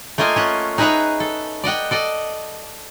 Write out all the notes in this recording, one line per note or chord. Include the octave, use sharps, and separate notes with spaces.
A3 A#3 F4 D#5 G#5
C#4 F4 F#5
D#4 G#4 B4 E5 F#5 A#5
A4
D5 D#5 F#5 G5
A4 D5 D#5